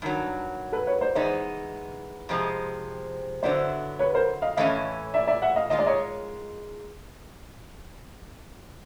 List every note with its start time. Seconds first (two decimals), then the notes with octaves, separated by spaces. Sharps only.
0.02 G2 D#3 F#3
0.72 A4 B4
0.87 B4 C#5
1.01 C5 D5
1.15 E3 G#3 B3 D#4 C5 D5
2.29 F2 C3 F3 G#3
3.43 D3 F#3 B3 E4 C5 D5
3.99 B4 C#5
4.14 A#4 C5
4.42 D#5 F5
4.57 A2 E3 A3 C#4 D#5 F5
5.14 D5 E5
5.27 D5 E5
5.42 E5 F#5
5.56 D#5 F5
5.70 G#2 D#3 G#3 F4 D#5
5.79 D5
5.86 C#5 D#5